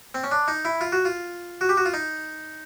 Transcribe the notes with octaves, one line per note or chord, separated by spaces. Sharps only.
C4
C#4
D4
D#4
E4
F4
F#4
F4
F#4
G4
F#4
F4
D#4